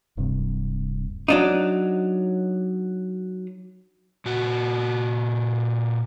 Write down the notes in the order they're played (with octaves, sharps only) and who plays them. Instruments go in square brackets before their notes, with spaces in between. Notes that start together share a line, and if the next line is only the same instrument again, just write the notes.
[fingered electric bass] D1 G2 C3
[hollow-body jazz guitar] F#3 D4 D#4
[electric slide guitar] A#2 F#4